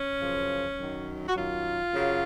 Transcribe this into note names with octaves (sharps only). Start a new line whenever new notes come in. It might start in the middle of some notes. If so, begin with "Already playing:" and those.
Already playing: C#4
F#2 C#3 F3
F#2 D#3 F#3
F#4
F#2 D#3 F#3 F4
F#2 C#3 F#3